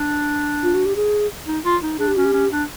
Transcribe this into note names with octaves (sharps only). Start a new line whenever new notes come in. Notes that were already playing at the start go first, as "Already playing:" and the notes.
Already playing: D4
F4
F#4
G4
G#4
D#4
F4
D#4
D4 G#4
G4
C#4 F#4
G4
C#4
D4